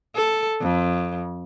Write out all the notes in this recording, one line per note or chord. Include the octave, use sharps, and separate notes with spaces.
A4
F2